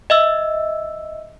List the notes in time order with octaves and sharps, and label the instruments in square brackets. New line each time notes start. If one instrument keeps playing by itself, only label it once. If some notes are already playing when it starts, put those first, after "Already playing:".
[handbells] D#5 E5 E6